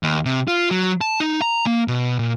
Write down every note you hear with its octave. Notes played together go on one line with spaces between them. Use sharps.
D#2
C3
F4
F#3
A5
D#4
A#5
A#3
B2
A#2